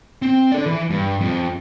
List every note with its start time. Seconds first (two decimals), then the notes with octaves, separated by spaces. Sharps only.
0.22 C4
0.52 A4 D5
0.66 E3
0.90 G2
1.21 F2